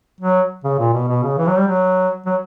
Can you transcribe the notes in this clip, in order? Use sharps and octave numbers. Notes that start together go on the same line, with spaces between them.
F#3
C#3
A#2
B2
B2
C#3
E3
F#3
G3
F#3
F#3